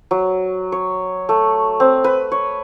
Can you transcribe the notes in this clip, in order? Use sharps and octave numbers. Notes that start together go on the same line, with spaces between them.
F#3
C#5
A3
C4
B4
C#5